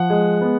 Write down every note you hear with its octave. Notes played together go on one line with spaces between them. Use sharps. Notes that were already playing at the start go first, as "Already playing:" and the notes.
Already playing: F3 F#5
G#3
B3